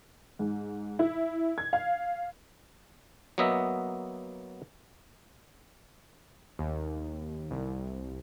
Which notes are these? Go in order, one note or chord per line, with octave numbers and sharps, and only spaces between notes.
G#2
E4
G#6
F5
F#3 A#3 B3 D#5 E5
D#2
C2